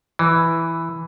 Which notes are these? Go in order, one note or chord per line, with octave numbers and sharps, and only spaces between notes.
E3